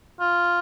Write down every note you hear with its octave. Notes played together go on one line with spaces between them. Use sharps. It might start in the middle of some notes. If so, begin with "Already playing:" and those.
F4